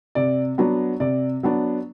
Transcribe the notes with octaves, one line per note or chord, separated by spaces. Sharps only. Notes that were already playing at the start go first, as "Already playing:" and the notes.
C3 D5
F#3 B3 D4
C3 D5
F#3 B3 D4